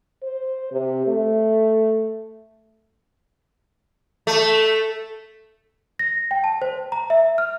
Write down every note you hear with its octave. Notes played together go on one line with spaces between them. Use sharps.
C5
C3
A3
A3
A#6
G5
A5
C5
A#5
E5
F6